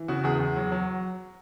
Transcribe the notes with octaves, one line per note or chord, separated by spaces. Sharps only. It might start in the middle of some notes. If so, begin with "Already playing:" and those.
Already playing: E3
C#3 F#4
E2 G#4
E2
F#3
F#3